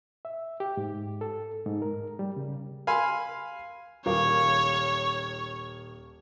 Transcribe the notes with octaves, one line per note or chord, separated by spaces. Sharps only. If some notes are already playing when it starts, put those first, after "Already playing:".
E5
G4
G#2
A4
G#2
A#4
G3
C#3
F5 G#5 B5 C6
D#1 A#4 C#5 F5